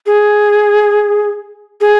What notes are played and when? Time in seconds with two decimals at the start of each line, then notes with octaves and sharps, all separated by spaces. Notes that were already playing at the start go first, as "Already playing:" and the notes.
0.06 G#4
1.81 G#4